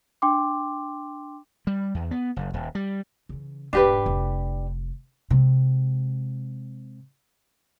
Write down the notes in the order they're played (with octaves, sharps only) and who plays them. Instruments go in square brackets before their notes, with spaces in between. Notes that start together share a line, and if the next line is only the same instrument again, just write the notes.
[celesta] D4 G5 C6 D6
[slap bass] G3
E2
B3
F#1
D#1
G3
[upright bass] C#3 E3
[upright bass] E1 G#2 [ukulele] D4 G4 B4
[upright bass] F1 D3
C3 G#3